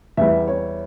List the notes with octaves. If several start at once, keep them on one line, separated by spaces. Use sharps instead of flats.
E2 E3 G3 E5
C#5